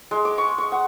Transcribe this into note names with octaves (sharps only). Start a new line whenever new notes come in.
G#3
D6
C#6
C#6
F#5